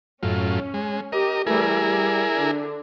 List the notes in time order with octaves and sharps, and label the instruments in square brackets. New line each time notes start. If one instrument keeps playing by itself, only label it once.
[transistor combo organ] F#2 A2 F4 [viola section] C#4
[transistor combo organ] G#3
[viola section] G4 [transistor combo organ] A#4 D#5
[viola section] E3 G3 A3 [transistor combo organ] E4 G#4 A#4
[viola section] G3
D3 D4